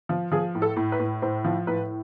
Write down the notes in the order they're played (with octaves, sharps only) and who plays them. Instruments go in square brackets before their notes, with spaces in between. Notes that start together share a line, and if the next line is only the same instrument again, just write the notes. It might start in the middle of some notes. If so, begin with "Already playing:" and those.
[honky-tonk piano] F3
F3 G#4
A2
A4
A2
B4
A2
A2 C5
F3
A2 B4